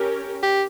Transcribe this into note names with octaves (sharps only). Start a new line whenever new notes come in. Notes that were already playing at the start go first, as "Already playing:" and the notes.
Already playing: C#4 G4 A#4
G4